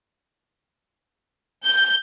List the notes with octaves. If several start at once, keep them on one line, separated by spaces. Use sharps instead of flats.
G6